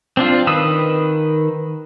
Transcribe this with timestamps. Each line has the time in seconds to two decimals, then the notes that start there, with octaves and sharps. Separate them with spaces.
0.17 C4 D4 F4
0.47 D#3 B4 D#6 E6